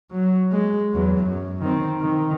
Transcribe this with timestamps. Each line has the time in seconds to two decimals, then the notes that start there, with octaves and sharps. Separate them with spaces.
0.11 F#3
0.52 G#3
0.93 E2 F#3
1.23 F#2
1.61 D#3 C4
2.01 D#3